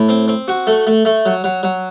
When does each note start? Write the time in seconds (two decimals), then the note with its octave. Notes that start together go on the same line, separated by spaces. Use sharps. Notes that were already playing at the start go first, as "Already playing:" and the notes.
Already playing: A2
0.09 C4
0.28 C4
0.48 F#4
0.67 A3
0.87 A3
1.05 A3
1.26 F#3
1.44 F#3
1.63 F#3